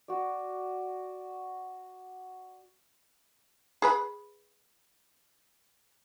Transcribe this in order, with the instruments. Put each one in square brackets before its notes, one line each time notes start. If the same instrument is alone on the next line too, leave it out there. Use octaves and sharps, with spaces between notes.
[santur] F#4 D5
[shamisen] G#4 B4 B5